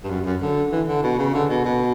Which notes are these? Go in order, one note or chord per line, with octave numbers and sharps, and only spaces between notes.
G2
F#2
F#2
D3
E3
D3
B2
C#3
D3
B2
B2